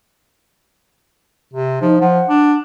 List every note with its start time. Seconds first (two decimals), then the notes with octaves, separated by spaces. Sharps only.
1.53 C3
1.81 F3 D#4
2.00 F3 F#5
2.28 D4